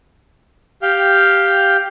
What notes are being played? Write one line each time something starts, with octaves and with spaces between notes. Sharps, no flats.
G4 F5 G5